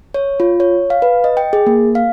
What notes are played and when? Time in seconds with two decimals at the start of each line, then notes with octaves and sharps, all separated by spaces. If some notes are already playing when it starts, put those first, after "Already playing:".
0.14 C#5
0.40 F4
0.60 C#5
0.90 F5
1.02 B4
1.24 D#5
1.37 G5
1.53 G#4
1.66 A#3
1.95 F5